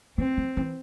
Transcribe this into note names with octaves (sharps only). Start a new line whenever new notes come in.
E3 C4
F3
E3